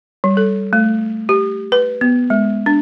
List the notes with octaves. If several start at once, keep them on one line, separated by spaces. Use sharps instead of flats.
G3
A4
A3
G4
B4
B3
G#3
D4